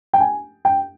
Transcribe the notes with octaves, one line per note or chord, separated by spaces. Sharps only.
G5
G#5
G5